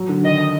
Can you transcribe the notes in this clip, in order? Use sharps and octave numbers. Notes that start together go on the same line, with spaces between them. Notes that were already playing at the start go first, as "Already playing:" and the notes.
Already playing: F#3
D3
D#3 D#5